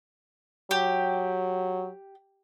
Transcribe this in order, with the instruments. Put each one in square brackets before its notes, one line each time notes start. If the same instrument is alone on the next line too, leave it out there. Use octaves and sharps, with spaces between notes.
[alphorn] F#3 [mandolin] G4